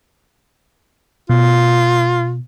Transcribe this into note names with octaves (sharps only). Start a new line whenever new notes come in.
B2 F4